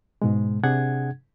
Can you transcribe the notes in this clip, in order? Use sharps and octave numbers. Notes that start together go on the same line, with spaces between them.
G#2 B2 G#3
C3 D4 G#4 F#5 G#6